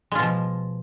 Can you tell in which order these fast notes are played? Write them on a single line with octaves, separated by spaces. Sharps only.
G#3 F4 B2 F3